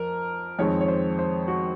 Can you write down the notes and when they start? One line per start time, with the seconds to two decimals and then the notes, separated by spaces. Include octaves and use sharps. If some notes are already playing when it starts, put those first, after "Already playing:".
Already playing: F2 A#4
0.59 F2 D#3 G#3 C4 C#5
0.81 C#5
0.88 C5
1.19 C5
1.48 F#4